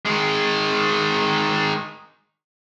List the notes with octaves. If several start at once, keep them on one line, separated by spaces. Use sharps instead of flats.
D#3 G#3